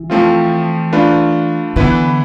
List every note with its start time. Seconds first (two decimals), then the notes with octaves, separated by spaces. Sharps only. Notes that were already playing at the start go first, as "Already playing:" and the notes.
Already playing: E3
0.10 F3 A3 C4 F4
0.93 A3 D4 F4 B4
1.76 D3 E3 B3 E4 B4